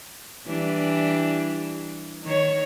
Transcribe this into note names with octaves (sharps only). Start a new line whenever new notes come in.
E3 G3 D4
D#3 C#5